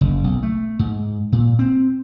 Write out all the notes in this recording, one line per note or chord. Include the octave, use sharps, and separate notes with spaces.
F#1
B1
A3
G#2
A#2
C4